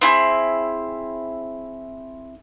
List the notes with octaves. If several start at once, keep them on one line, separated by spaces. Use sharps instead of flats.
C4 E4 G#4